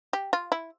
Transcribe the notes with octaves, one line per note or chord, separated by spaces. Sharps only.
G4
F4
E4